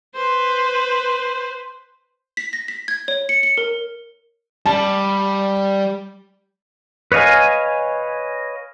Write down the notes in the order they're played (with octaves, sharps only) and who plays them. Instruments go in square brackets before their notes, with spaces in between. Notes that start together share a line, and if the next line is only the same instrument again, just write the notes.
[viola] B4 C5
[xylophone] B6
A#6
B6
G#6
C#5
C#7
C#7
A#4
[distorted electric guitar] G3 [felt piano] A5
[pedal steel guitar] B4 C#5 D#5 F5 G#5